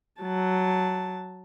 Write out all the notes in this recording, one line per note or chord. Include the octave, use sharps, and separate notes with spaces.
F#3 A5